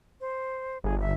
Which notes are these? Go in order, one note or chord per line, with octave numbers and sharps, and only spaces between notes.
C5
G1 G#4
E5